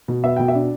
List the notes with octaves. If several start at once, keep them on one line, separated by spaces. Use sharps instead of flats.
B2
B3 E5
B2 G5
E5
D4